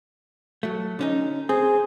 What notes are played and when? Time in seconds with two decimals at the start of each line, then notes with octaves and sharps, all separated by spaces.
0.63 F#3 A3
0.99 D3 C#4 D#4
1.49 C4 G#4